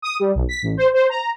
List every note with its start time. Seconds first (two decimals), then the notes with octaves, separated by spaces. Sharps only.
0.02 D#6
0.20 G3
0.35 B1
0.49 B6
0.62 A1
0.77 C5
0.94 C5
1.09 A#5